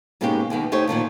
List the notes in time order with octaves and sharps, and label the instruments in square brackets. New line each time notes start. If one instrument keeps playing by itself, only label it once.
[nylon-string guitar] G#2 B2 G#3 A#3 C#4 G4
D#2 D#3 A#3 B3
A3 D#4 G4 C5 C#5
A#2 D#3 F3 A3